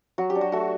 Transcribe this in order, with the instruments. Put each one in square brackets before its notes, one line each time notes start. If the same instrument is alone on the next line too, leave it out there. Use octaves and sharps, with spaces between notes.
[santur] F#3 F#4
G4
D4
F#4
A3 F#4